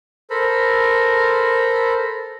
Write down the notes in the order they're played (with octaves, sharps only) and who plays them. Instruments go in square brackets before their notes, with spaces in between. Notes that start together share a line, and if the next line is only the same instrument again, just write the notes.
[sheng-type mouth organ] A4 A#4 C5 B5